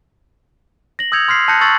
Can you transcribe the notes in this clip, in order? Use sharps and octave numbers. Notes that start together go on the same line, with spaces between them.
A#6 F#7
D#6 E6 G6 G#6 C#7 F7
C6 F6 B6 C7
A5 F#6 G6 A#6 C#7
C#6 E6 A6 F#7